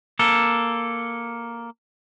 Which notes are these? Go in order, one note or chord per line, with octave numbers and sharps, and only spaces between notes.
A#3 A4